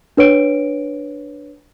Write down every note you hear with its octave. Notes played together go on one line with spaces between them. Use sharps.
D4 B4 C#5 D7